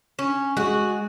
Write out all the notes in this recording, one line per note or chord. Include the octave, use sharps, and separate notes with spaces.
C#4
G#3 F#4 G#4